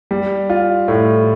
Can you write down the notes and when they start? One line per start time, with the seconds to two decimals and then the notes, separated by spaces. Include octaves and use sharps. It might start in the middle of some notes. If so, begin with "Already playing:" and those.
0.11 G3
0.50 F4
0.88 A2